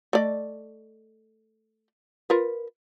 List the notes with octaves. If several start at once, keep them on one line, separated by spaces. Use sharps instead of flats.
A3 D5 D#5
F4 A#4 B4